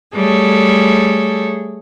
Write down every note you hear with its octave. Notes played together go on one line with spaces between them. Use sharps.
G3 A3 G#4 A4 C#5